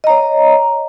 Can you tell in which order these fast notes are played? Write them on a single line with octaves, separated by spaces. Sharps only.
D#5 A#5 C#5